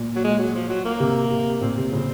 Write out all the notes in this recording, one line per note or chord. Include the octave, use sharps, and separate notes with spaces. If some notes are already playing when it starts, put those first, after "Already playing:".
Already playing: A#2
F#3
G#3
F#3
F3
F#3
A#3
C3
C3
A#2 C4
C3
A#2 C#3